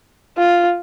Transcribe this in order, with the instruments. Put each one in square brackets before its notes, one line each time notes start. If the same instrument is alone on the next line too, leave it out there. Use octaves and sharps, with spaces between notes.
[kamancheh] F4